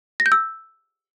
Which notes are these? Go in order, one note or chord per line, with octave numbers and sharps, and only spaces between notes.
A#6
G6
E6